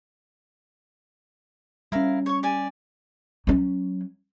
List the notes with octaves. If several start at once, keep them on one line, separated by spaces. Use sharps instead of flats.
G3 C#4 E4 A#4 F5
C#5 C#6
G4 D5 G#5
F#3 C#4